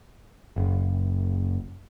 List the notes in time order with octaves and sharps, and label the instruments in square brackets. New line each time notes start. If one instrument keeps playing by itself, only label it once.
[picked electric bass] F#1